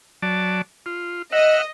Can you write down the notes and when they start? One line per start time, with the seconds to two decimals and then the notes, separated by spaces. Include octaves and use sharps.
0.22 F#3 D5 A5
0.86 F4
1.32 D#5 E5 F#5